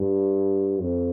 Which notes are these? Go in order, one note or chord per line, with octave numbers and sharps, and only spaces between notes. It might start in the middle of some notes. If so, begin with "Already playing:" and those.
Already playing: G2
F2